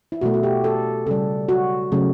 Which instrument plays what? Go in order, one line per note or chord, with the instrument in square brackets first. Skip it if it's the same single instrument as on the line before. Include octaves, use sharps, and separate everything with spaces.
[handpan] E4
B2 A3 F#4
F#4
G4
A4
C#3 G3 A4
F#4
C#3 F#3 A3